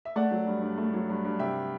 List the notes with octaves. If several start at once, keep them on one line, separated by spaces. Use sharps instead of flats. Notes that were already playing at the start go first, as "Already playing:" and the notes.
E5
A3 D5 F#5
F#3
G2
G2
A3
F#3
G2
G2
C3 E5 G5